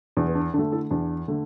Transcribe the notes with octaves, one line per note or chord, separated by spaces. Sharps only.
E2 D4
B3
D4
D3 A3 D4
E4 A4
E2 D4
D3 A3